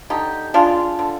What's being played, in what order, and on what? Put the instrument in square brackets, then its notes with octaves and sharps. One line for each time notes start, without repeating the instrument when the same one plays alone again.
[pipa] D3 D#4 G4
G#3 D4 F4
D3